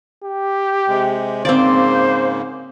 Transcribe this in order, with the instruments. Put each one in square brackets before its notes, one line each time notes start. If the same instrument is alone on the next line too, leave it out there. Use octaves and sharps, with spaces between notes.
[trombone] G4
[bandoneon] C3 G#3
[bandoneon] G#2 C#3 A#3 [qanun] C4 D5 [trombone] C5